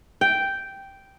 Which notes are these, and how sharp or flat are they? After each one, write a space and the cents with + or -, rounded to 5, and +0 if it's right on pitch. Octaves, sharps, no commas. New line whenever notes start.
G5 -5